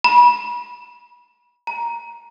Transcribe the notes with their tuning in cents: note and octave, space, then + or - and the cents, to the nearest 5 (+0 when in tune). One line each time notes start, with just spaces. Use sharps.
B5 -30
A#5 +10